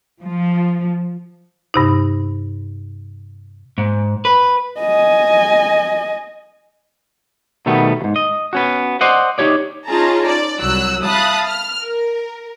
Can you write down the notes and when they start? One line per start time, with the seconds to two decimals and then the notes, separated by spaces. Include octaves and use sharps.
0.22 F3
1.74 G2 C3 D#4
3.78 G#2
4.25 B4
4.80 D#5 G#5
7.66 B2 D#3 G3 A3 B3
8.01 D#2 G#2
8.16 D#5
8.53 B3 C#4 F#4
9.01 C5 D5 D#5 F#5
9.38 D#4 F#4 G4 C#5 D5
9.87 C#4 D#4 F4 G#4 A5 A#5
10.26 D5
10.60 C2 F#3 E6 F#6
11.05 E5 F5 A5 B5 D#6 F#6
11.46 F6
11.82 A#4